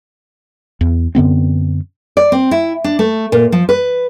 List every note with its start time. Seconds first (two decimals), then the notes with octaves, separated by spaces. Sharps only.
0.81 E2
1.15 F#2 D3 B3 C4
2.17 D5
2.32 C4
2.51 E4
2.84 D4
2.99 A3
3.32 A#2
3.52 F3
3.69 B4